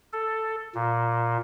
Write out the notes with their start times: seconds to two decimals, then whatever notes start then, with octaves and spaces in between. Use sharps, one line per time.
0.13 A4
0.75 A#2